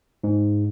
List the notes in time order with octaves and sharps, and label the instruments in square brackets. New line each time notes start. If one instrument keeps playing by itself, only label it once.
[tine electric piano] G#2